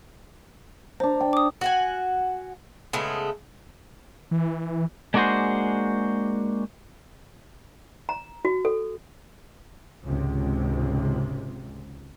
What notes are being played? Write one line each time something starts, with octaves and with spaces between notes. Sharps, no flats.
D4 C5 A#5
G5
D6 D#6
F#4 F#5 G#5
C#3 G#3 A3 B3
E3
G#3 A#3 D4 F#4 G#4 C5
A#5
F#4
A4
G#1 C#2 C3